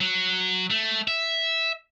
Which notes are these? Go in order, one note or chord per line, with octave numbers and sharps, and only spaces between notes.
F#3
A3
E5